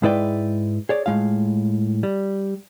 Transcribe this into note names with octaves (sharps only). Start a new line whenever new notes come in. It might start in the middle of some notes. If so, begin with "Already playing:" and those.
G#2 G#3 E4 B4 D5 G5
G#4 C#5 D5
A2 G#3 F4 F5
G3